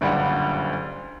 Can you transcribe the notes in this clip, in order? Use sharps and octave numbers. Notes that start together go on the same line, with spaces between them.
F#1 D2 G2 A#2 G3 F#5